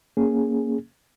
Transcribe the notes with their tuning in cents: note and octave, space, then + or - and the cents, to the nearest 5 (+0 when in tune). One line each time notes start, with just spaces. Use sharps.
A#3 +0 C#4 +5 G#4 +0